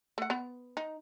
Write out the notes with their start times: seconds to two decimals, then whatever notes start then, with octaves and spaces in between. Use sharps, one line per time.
0.18 A3 F#5
0.30 B3
0.77 D#4